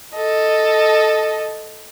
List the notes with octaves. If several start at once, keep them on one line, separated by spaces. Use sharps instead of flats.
A4 D#5